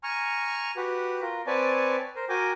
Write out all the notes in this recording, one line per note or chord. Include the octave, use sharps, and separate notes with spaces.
G#5 A#5 C#6 F6
F#4 G4 B4
F4 A#4
C4 B4 C#5 D5 G#5 A5
A#4 C5
F#4 A#4 G5 G#5 D6